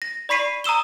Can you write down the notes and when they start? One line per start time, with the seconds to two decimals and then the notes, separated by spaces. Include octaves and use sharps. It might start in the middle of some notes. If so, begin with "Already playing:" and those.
0.02 A#6
0.29 D5 B5 C#6 B6 C7 D#7
0.64 A#5 D#6 E6 E7 G7